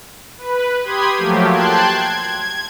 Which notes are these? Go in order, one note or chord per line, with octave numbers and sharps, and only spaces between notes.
B4
G4 B5 C6 D#6 G#6
F3 F#3 A3 A#3 G4
G5 A5 C6 F#6 G#6
G#6